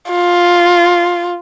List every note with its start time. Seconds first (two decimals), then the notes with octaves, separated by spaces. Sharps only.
0.11 F4